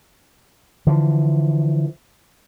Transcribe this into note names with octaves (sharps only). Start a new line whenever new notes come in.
D3 E3 F3